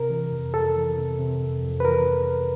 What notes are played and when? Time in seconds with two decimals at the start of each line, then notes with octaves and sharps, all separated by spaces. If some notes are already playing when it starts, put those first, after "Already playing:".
Already playing: C3 A#4
0.10 E3
0.32 F2
0.53 F2 A4
0.76 E3
0.97 C3
1.19 C3
1.41 F2
1.63 F2
1.80 B4
1.84 E3 A#4